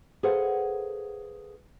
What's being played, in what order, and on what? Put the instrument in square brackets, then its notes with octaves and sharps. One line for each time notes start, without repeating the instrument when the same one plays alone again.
[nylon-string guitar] G#4 A4 B4 C5 F5 F#5